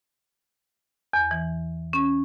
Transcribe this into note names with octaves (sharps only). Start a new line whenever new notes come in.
E2
E3
C#4